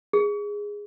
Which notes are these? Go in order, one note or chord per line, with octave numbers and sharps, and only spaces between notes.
G#4